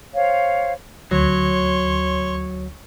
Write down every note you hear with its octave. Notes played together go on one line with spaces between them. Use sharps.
C5 C#5 F5
D2 F#3 C#5 C6